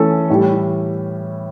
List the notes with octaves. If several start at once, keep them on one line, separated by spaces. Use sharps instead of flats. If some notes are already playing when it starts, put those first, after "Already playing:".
Already playing: E3 A3 C#4 A4
A2 E3 G3